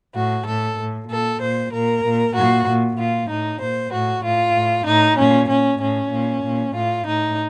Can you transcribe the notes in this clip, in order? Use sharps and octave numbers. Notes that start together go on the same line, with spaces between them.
A2 F#4
A2 A4
A2
A#2 A4
A#2 C5
A#2 A#4
A#2
A#2 F#4
A#2
A#2 F4
A2 D#4
A#2 C5
A2 F#4
A2 F4
A2
A2 D#4
A#2 C#4
A#2 C#4
A2 C#4
A#2
A#2
A2 F4
A2 D#4